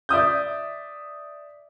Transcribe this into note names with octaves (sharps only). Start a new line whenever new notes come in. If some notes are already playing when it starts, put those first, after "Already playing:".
D5 E5 D#6 G6